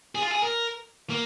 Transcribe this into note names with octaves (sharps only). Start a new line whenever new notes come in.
G#4
F4
G#4
A#4
A#3